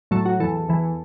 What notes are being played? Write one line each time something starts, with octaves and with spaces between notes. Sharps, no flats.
A2 F#3 A4
F#4
E2 E3 A4
E2 E3